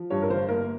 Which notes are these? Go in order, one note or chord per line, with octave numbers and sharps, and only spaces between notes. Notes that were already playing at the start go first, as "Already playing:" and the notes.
Already playing: F3
G2 C#5
A#4
G1 C5
A#3 A#4